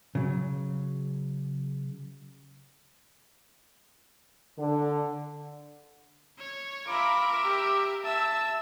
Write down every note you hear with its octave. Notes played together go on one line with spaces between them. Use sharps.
C#3 F#3
D3
C#5
F4 A#4 E5 B5 D6
G4
E5 A5 E6